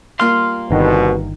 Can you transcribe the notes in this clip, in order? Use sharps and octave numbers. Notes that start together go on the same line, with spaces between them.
G3 A#3 F4 F5 C6 F6
G1 C2 B2 D#3